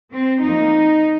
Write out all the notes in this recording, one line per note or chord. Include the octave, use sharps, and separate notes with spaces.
C4
F2 F3 A#3 D#4